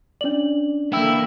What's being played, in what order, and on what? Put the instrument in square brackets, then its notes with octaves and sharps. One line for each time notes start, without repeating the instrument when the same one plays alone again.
[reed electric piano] C#4 D5 [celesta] D4 F#7
[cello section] D3 E3 A#3 [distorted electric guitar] E4 [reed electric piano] G5 E6